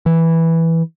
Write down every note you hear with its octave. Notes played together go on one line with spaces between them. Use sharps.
E3